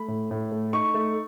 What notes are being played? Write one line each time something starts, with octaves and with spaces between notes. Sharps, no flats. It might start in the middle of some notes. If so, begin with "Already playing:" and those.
Already playing: A3 B5
A2
A2
A3
D#4 C#6
A3